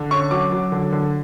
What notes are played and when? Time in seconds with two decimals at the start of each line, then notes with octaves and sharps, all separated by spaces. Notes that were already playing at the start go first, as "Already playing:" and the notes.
Already playing: D3
0.11 C#4 C#6
0.31 F#3 D6
0.52 F#3
0.72 D3
0.92 D3